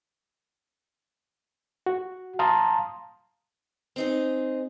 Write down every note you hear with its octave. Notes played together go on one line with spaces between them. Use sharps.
F#4
F5 A5 A#5 C6 D#6
C4 D#4 G#4